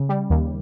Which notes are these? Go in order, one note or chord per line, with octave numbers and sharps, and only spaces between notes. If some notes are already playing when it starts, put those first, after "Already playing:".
Already playing: C#3
G3
D#2